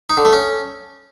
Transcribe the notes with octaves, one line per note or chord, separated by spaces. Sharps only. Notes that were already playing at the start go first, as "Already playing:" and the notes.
D#4
D3
A3
C#4